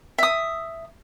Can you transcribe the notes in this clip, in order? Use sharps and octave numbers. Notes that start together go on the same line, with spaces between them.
E5 D#6